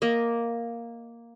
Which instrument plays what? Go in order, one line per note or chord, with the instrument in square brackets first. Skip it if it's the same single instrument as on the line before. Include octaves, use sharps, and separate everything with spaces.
[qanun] A#3 D#5